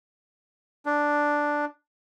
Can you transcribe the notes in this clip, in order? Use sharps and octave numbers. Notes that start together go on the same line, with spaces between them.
D4